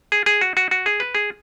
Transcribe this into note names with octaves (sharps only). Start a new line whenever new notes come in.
G#4
G#4
F#4
F#4
F#4
G#4
B4
G#4